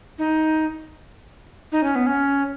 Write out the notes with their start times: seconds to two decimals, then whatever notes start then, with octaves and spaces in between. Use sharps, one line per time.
0.19 D#4
1.72 D#4
1.83 C#4
1.95 B3
2.07 C#4